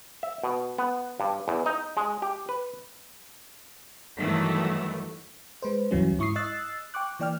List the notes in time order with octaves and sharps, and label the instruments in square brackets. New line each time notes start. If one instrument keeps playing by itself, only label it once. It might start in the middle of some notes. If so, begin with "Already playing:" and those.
[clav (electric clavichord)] E5
B2
B3
G2
E2
D#4
G#3
G4
B4
[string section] G2 D#3 E3 F#3 A3
[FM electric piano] G#3 B4 C5
D2 G2 E3 F#3 G3 C#4
G#2 E4 C#6 D#6 C7
D#5 E6 F#6 A6 C7
G5 C#6 D6 F#6
E3 A#3 D5 G5 F6